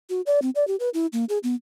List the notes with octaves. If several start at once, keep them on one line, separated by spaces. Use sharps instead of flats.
F#4
D5
C4
D5
G4
B4
E4
A#3
G#4
B3